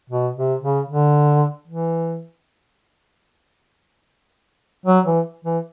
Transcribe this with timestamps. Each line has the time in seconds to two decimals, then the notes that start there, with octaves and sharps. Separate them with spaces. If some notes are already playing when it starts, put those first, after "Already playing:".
0.10 B2
0.37 C3
0.62 C#3
0.89 D3
1.68 E3
4.86 F#3
5.06 E3
5.45 E3